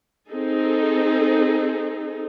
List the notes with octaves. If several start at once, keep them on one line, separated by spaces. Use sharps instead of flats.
C4 D#4 G#4 A4